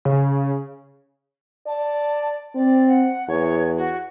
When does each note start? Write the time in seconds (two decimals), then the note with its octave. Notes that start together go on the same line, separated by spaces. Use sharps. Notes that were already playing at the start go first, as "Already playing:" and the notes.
0.05 C#3
1.67 D5 A5
2.55 C4 D5
2.88 F#5
3.28 E2 C#5
3.77 F#4